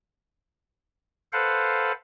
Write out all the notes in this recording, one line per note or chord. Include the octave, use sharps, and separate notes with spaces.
A4 B4 C5 F5 F#5